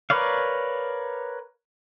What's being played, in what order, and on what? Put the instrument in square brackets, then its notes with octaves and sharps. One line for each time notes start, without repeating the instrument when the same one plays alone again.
[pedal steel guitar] A#4 B4 C#5 D5 F5